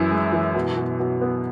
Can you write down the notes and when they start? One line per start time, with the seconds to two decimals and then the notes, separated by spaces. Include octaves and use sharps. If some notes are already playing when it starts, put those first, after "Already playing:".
Already playing: F#2 E3 E4
0.11 G#3
0.33 E3
0.55 B2
0.77 B2
0.99 B2
1.21 B3